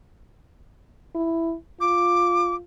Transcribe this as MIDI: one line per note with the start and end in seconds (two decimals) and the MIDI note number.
1.15 1.55 64
1.81 2.62 65
1.81 2.55 86